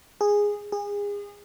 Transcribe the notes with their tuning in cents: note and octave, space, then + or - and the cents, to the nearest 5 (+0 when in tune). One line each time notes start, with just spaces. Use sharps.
G#4 -10
G#4 -30